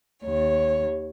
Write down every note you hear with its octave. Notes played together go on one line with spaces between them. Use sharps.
D#2 C#5